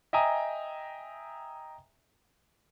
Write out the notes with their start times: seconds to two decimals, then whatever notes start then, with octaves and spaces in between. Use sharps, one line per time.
0.13 D#5 E5 G5 G#5 A#5 D#6